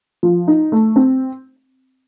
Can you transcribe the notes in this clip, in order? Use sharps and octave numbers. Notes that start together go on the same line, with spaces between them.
F3
D#4
A3
C4